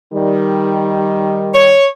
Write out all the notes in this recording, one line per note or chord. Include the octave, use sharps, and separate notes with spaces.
D#3 G3
C#5